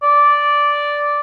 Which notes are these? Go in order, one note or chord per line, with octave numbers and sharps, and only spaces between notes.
D5